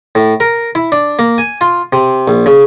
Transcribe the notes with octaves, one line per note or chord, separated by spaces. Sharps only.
A2
A#4
E4
D4
A#3
G#5
F4
C3
A#1
C#3